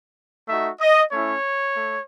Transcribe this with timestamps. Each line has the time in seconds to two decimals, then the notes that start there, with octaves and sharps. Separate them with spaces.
0.48 A3 D#4 F#4 E5
0.81 D#5
1.12 A3 C#4 E4 C#5
1.76 A3